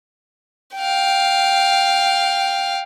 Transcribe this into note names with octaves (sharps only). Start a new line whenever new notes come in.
F5 G5